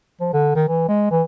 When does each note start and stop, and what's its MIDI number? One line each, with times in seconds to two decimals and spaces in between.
0.21 0.29 53
0.33 0.54 50
0.55 0.66 51
0.68 0.86 52
0.89 1.06 56
1.11 1.23 52